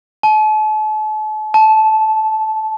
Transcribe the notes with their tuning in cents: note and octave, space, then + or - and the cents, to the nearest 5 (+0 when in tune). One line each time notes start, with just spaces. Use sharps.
A5 -40
A5 -15